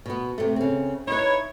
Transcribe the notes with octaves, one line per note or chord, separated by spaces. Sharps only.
B2 B3
C3 A3
C#3 C4
D#4 E4 B4 C#5